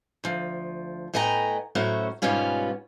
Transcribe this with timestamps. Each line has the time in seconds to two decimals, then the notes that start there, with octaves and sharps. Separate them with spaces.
0.24 D2 F3
1.14 A2 B3 D#5 G5 G#5 A#5
1.75 A2 F#3 C#4 F#4 C5 E5
2.22 G#2 B2 G3 B3 C#4 F4